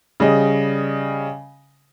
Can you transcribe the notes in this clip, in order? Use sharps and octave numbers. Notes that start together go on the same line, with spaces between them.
C#3 G3 D#5